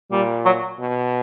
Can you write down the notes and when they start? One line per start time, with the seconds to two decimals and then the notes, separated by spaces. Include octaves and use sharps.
0.11 A#2 G3
0.45 F#3
0.79 B2